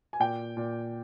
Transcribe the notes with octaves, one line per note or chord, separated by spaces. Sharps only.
G#5
A#2 G5
A#2